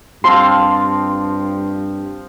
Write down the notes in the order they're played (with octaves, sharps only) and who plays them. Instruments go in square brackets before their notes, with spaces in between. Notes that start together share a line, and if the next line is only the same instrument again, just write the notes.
[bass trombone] G2 [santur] F3 C4 F5 [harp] C6